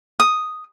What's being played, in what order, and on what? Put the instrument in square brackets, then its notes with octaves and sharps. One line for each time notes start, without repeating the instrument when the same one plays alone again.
[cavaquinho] D#6